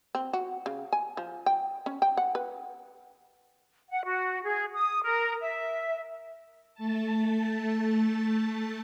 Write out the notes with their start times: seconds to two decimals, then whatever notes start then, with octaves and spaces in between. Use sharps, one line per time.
0.15 C4
0.33 F#4
0.66 C#3
0.93 G#5
1.17 F3
1.46 G5
1.86 C#4
2.02 G5
2.17 F#5
2.35 B4
3.89 F#5
4.04 F#4
4.44 G#4
4.73 D#6
5.03 A#4
5.41 E5
6.74 A3 A5